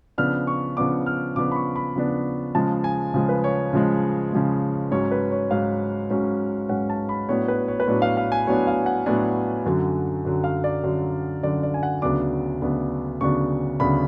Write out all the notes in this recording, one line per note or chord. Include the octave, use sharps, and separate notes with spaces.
C#3 F3 B3 D4 F6
C#6
C#3 F3 B3 D4 D6
F6
C#3 F3 B3 D4 D6
B5
C#6
B5
C#3 F3 B3 D4
C#3 F3 G#3 A5
G#5
C#3 F3 G#3
B4
C#5
C#3 F3 G#3
C#3 F3 G#3
G#2 F#3 C#4 C#5
B4
C#5
G#2 F#3 C#4 F5
G#2 F#3 C#4
G#2 F#3 C#4 F#5
A5
B5
A2 F#3 B3 D4 C#5
B4
C#5
B4
A2 F#3 B3 D4 C#5
F5
F5
G#5
A2 F#3 B3 D4 C#5
F5
F#5
A2 F#3 B3 D4 G#5
F#2 D3 F#3
F#2 D3 F#3
F5
D5
F#2 D3 F#3
F#2 D3 F#3 D5
D5
G#5
F#5
D2 C#3 F#3 B3 D4 D6
D2 C#3 F#3 B3 D4
D2 C#3 F#3 B3 D4 C#6
D2 C#3 F#3 B3 D4 B5